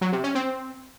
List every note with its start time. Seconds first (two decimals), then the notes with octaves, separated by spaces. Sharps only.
0.01 F#3
0.12 C3
0.24 C#4
0.35 C4